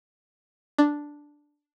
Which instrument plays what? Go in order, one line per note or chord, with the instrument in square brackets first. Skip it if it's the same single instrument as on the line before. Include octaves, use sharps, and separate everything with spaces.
[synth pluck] D4